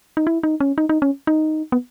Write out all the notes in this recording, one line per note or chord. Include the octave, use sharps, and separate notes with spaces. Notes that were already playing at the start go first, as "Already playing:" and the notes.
D#4
E4
D#4
C#4
D#4
D#4
C#4
D#4
B3